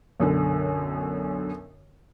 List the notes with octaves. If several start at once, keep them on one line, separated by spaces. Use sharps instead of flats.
B1 F#2 D3